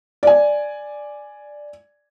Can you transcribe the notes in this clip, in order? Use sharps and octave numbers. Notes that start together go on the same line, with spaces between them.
D5 G#5